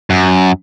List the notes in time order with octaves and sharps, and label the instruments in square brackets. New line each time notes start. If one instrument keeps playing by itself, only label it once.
[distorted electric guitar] F#2